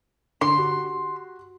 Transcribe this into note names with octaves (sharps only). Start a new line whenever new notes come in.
D3 C6
F#4 G4